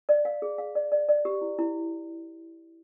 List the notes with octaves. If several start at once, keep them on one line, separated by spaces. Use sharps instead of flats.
D5
F5
G#4
F5
D5
D5
D5
G4
E4
E4